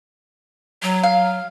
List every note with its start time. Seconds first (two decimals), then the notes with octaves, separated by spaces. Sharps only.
0.83 F#3
1.03 F5